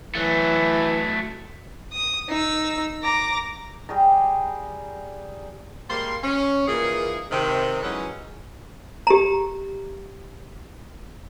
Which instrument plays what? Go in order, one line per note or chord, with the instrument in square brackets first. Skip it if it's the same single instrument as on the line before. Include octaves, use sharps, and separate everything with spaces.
[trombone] E3 [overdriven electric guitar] F#3 A3
[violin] D#6
D#4 E6
A#5 D6
[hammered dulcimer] G3 G4 G#4 A#5
[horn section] G3 G#3 A#3 C6
C#4
A#2 D#3 E3 A#3 G#4
C3 D#3
E3 F#3 G#3 C#4 D#4 B4
[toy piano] G4 A#5